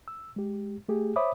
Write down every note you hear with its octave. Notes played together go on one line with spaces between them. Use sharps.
E6
G#3 G4
A3 G4 G#4
C5 C#5 E5 B5 D6 D#6